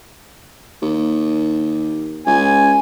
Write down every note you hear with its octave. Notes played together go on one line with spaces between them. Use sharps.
D#2
C#2 G#5